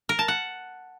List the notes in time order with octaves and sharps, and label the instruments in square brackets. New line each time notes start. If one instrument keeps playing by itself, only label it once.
[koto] A#4
A5
F#5